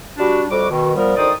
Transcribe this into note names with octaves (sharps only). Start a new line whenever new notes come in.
G3 D4 F#4
F2 G3 F#4 D6
B2 D#3
F3 G3 B3 A#4
D2 D#3 C5 D5 D#6